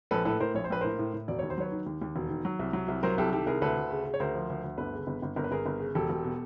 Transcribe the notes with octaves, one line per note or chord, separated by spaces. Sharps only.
A#1 A4 B4
A2 A4 B4
A2 A#4 C5
A#1 C#5
C5
A#1 B4
A2 A#4 C5
A2
A2
E1 D5
D#2 C#5
C5
F#3 B4 C#5
D#3
D#2
D#2
E1
D#3
F#3
C2
F#3
C2
F#3 A#4 C5
C2 G4 A4
D#3 G4 A4
C2 G#4 A#4
D2 A4 B4
D2
C#3
C#3
C#5
D2 A#4 C5
F3
D2
D2
G1 A4 B4
C#3
G1
G1
G1 A#4
B4
G1 G#4 A#4
G1
C#3
E1 G4 A4
E1
B2